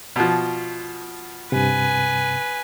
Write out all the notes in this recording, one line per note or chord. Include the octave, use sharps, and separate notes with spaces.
B2 F3
G2 C3 B4 G#5